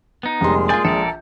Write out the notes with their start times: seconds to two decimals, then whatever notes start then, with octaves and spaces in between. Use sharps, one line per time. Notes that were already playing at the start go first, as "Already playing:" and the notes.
0.23 B3 D#4
0.41 F1 A#2 G3 G#3 G#4 C6
0.69 F4 D5 G#5 G6
0.85 A#1 A4 A#4 D5